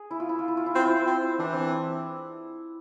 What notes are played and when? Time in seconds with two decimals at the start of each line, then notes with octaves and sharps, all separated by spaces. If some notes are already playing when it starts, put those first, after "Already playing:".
Already playing: G#4
0.11 E4
0.20 F4
0.29 E4
0.39 F4
0.48 E4
0.57 F4
0.66 E4
0.75 C4 F4
0.86 E4
1.07 C4
1.39 E3 D4
1.53 C4